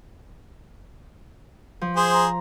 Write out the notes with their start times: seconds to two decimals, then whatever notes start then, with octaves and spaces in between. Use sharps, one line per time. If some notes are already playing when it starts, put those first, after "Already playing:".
1.81 F3
1.96 G#4 C5
2.14 A#5